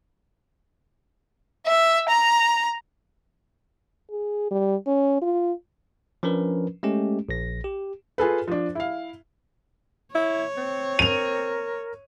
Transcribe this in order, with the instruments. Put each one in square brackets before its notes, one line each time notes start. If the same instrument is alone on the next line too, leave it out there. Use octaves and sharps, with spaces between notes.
[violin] E5
A#5
[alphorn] G#4
G3
C#4
F4
[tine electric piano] F3 C#4 D4 A#4 B4
G#3 A3 C#4 G4
A#1 A#6
G4
[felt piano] F4 G#4 A4 B4
F3 D4
E4 F5
[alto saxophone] E4 [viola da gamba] C#5
[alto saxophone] C4
[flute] A#4 [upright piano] D#7 F7